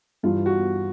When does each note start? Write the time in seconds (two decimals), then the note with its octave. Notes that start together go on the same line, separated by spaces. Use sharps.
0.23 G2 E3 F4
0.46 F#4